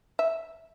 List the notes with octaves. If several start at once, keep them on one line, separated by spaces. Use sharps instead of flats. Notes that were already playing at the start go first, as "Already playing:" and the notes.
E5